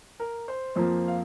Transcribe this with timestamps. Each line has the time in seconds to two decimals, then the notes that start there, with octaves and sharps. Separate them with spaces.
0.20 A#4
0.48 C5
0.75 F2 F3 A#3 C5
1.08 F5